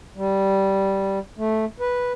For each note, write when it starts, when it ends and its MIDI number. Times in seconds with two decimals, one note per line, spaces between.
0.16 1.19 55
1.37 1.65 57
1.80 2.13 71